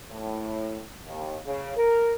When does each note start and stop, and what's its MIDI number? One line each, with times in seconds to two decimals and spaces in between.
0.12 0.82 45
1.06 1.37 39
1.45 1.72 49
1.77 2.14 70